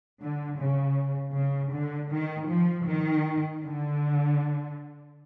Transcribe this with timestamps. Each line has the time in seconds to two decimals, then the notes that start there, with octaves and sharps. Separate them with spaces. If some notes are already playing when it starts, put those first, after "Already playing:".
0.22 D3
0.60 C#3
1.35 C#3
1.73 D3
2.12 D#3
2.50 F3
2.88 D#3
3.64 D3